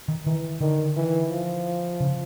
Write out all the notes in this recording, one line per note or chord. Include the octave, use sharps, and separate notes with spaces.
D#3
D#3 E3
D3 D#3
E3
F3
C#3